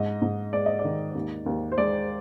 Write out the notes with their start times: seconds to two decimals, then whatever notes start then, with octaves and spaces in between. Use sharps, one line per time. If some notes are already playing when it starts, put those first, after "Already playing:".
Already playing: G#2 D#5
0.22 G#2
0.53 G#3 D5
0.66 D#5
0.79 D5
0.85 D#3
1.15 D#2
1.46 D#2
1.72 C5
1.78 G#3 D5